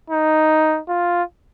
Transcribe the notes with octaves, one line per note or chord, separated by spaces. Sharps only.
D#4
F4